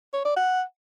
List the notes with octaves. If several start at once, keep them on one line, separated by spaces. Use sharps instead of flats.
C#5
D5
F#5